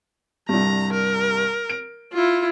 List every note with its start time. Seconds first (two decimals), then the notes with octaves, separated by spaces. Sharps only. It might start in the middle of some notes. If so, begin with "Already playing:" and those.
0.49 C2 G2 A#5
0.93 A#4
1.69 D7
2.13 E4 F4